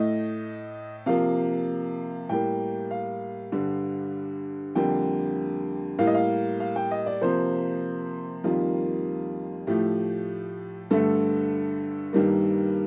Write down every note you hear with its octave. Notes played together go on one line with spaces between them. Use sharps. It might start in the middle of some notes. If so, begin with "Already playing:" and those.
Already playing: A2 A3 D#5
C3 F3 A#3 F5
A2 G3 A#3 G5
F5
G2 D3 G3
F2 D3 G3 A#3 G5
A2 G3 A#3 F5
D#5
F5
F5
G5
D#5
D5
C3 F3 A#3 C5
F2 D#3 G3 A#3 F4
A2 F3 A3 G4
G2 D3 A3 A4
G2 D#3 G3 A#3